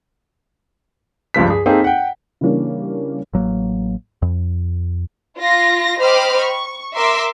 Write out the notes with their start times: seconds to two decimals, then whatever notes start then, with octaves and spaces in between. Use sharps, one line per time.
1.34 C#2 G2 F3 B6
1.50 G#4
1.66 A#3 C4 D#4 G#4 A4
1.84 F#5 G5
2.41 C#3 E3 G3 A#3 C#4 D4
3.33 A1 F#3 A#3
4.22 F2
5.37 F4 A#6
6.00 C5 D#5 G5 B5 D6 F6
6.40 C#6
6.95 A#4 E5 C6 D6 E6